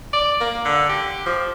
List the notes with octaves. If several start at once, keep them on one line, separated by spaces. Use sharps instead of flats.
D5
A#3
D3
G4
F3